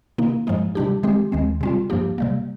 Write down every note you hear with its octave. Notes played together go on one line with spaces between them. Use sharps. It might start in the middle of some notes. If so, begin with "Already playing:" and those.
C3 D#3 A#3 D#4
G2 F3 G#3 D#4
C3 G3 D4 G4
D#3 G#3 C4 G4
D#2 D#3 G#3 C4
C3 G3 C4 F4
G2 F3 A#3 D4 G4
C3 G3 A#3